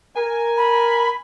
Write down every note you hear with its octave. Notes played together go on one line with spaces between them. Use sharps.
A#4 G#5
B5